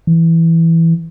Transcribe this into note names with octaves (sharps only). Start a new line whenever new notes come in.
E3